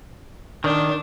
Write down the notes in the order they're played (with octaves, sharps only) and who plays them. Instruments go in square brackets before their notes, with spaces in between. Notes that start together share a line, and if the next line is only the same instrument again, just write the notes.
[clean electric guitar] D#3 [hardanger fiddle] D4